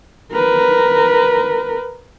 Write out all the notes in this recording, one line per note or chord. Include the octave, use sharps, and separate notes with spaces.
A#4 B4